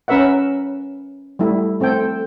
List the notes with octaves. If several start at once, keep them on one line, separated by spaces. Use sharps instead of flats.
C#4 A#4 B4 E5 F#5
G3 A3 E4
A3 C4 A4 G5